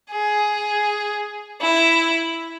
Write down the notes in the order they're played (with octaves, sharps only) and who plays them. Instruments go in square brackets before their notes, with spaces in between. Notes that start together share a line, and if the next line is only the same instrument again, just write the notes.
[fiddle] G#4
E4